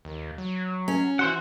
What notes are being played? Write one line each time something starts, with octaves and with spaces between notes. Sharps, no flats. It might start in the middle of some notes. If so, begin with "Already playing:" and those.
D#2
F#3
C#4
E3 F#4 C5 F#5